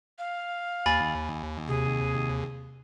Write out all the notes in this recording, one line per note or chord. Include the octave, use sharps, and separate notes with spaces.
F5
D#2 G#5 B5 A6
C3 G#4